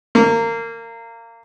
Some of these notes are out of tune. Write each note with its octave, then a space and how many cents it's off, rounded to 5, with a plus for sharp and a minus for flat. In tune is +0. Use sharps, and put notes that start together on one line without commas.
A#3 -25